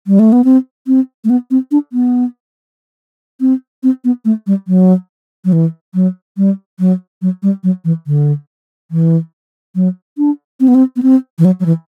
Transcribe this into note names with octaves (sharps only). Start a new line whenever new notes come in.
G3
A3
B3
C4
C4
A3
B3
C4
D4
B3
C4
C4
B3
A3
G3
F#3
F#3
E3
F#3
G3
F#3
F#3
G3
F#3
E3
D3
E3
F#3
D4
C4
B3
C4
B3
C4
E3
F#3
F#3
E3